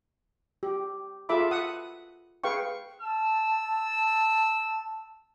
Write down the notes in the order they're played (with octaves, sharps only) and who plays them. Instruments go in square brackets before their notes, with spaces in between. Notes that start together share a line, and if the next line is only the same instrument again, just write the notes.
[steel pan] G4
F4 G#4 A4 E5 B5 D6
F#5 D#6
G#4 B4 F5 G5 C#6
[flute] A5 [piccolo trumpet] E6